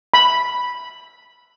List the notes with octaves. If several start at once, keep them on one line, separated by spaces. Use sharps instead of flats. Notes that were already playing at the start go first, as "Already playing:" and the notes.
B5